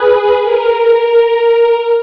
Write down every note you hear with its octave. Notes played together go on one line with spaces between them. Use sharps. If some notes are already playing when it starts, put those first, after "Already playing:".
Already playing: G#4 B4
A#4